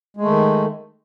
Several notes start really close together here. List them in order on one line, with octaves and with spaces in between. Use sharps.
G#3 A3 D#3